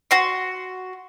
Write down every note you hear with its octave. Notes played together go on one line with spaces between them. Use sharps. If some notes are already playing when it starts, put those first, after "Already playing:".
F#4 C6